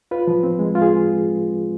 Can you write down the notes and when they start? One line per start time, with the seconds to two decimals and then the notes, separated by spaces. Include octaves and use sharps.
0.11 F4 B4
0.28 F3
0.43 C4
0.59 G#3
0.75 F4
0.82 G#4